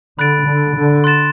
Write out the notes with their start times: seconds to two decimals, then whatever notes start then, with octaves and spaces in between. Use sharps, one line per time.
0.19 D3 B5 F#6 A6 D7
0.47 D3
0.76 D3
1.04 C6 F#6 A6 E7